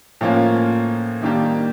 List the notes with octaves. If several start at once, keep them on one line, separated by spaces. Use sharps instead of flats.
A2 F3 A#3 C#4 F4
D#3 G3 A#3 D4 G4